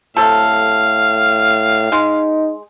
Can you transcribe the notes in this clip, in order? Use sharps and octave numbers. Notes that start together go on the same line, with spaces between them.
A2 C3 A4 F5
G#3 D#4